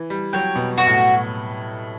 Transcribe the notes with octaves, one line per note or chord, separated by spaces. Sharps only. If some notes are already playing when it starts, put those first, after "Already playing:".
Already playing: E3
G3
F#3 C#5 G5
B2
B2 F#4
A2